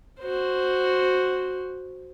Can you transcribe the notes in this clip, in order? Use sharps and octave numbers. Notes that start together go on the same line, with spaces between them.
F#4 C5